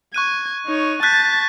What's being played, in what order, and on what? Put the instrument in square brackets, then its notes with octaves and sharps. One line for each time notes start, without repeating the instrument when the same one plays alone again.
[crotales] C#6 F#6 D#7 [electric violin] G#6
[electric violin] D#4 C#5
[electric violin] A5 A6 [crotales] F#6 G6 B6